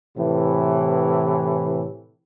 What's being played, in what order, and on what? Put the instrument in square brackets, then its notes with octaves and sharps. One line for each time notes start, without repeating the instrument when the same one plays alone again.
[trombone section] A2 C3 E3